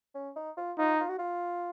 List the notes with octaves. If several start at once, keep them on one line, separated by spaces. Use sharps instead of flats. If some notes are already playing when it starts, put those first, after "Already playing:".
C#4
D#4
F4
D#4 F4
F4
F#4
F4